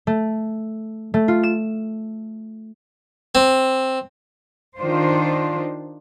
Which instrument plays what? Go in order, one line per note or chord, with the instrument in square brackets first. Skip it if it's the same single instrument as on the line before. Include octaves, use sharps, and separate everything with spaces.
[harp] A3
A3
F4
E7
[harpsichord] C4
[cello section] D#3 D4 F4 C5